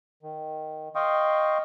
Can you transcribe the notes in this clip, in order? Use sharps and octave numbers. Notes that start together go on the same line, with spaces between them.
D#3
D#5 F5 G5 C6 C#6 D#6